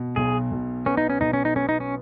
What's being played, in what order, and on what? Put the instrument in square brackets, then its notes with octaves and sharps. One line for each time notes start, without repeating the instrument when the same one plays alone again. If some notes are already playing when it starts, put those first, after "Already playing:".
Already playing: [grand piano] B2
[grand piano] B1 [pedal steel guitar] G#4
[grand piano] B1
[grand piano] B3 [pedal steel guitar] C#4
[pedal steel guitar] D#4
C#4
[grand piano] B1 [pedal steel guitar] D#4
[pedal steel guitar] C#4
D#4
[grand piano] B3 [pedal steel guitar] C#4
[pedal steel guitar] D#4
C#4